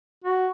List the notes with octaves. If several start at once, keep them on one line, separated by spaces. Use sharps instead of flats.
F#4